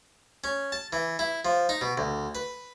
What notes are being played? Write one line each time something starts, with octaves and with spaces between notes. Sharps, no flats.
C#4
A5
E3
E4
F3
D#4
B2
D2
B4